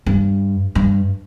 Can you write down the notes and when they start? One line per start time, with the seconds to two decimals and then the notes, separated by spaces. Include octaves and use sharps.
0.06 G2
0.75 G2